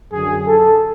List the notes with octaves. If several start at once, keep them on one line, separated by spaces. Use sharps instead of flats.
F#2 D3 F#3 G#4
A4